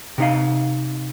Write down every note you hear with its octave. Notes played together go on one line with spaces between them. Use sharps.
C3 D#4 F5